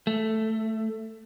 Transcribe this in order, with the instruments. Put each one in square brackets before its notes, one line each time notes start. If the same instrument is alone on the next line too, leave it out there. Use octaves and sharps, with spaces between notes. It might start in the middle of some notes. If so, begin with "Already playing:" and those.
[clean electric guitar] A3